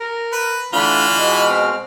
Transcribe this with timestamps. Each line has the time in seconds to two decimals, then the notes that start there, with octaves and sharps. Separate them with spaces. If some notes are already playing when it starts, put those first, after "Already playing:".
0.01 A#4
0.32 B4
0.73 D3 E3 A3 D4 F4 B5
1.16 B2 G#3 F6
1.49 C4